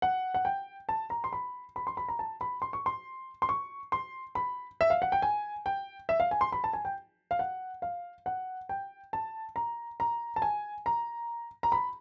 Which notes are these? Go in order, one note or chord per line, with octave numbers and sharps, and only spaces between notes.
F#5
F#5
G5
A5
A#5
C6
B5
B5
C6
B5
A#5
A5
B5
C6
C#6
C6
C6
C#6
C6
B5
E5
F5
F#5
G5
G#5
G5
E5
F5
G#5
C6
B5
A5
G#5
G5
F5
F#5
F5
F#5
G5
A5
A#5
A#5
A5
G#5
A#5
A#5
B5